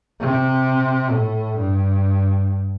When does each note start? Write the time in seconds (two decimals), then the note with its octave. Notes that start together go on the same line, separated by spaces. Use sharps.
0.20 C3
1.11 A2
1.57 G2